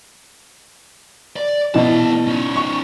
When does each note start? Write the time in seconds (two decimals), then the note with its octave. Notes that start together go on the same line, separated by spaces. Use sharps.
1.36 D5
1.74 B2 E3 A#3 A5
2.27 C#4 D#4
2.56 C#6